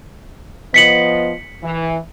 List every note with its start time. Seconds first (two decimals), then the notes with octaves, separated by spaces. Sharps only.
0.74 F3 B3 D#5 B6 C#7 F#7
1.63 E3